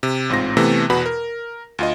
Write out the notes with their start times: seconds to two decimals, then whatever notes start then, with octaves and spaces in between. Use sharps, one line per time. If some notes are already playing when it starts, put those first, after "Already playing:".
0.03 C3
0.29 A1 G#2 C4 F4 A#6
0.57 C3 E3 A3 B3
0.90 E2 B2 F#4 B4 B5
1.06 A#4
1.79 D2 F4 D#5